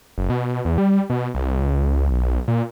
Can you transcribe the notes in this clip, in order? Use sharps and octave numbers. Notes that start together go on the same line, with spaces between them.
F#1
B2
E2
G3
B2
C2
C#2
B1
A#2